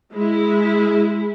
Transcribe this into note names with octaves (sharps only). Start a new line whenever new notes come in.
G#3 E4